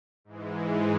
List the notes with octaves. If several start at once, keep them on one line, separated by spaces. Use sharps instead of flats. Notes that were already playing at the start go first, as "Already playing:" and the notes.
G#2 E3 G#3